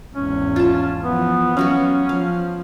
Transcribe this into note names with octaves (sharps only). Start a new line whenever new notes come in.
G#1 E2 C#4
F4 A5
E3 F3 B3
F#3 B3 C#4 F#4 F5
F3 F5